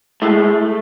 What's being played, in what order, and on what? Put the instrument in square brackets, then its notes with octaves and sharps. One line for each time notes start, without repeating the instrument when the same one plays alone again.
[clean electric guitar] A2 G#3 A3 A4